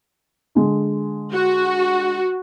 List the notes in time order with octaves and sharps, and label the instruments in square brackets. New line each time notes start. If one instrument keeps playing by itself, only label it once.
[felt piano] D3 G#3
[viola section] F#4